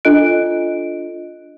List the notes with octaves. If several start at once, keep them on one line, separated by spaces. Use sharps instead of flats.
D4 F4 A4 D#5 F#6 D7